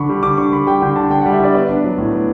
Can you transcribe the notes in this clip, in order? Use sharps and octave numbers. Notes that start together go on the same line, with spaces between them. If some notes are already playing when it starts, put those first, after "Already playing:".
Already playing: D3 D4 B5 C#6
G3
D3 D6
D4 C#6
D3 B5
G3 G5
D3 G5
D4 A5
D3 G5
F#5
G3
E5
D3 D5
B3 D5
D4
F#3
A2
B3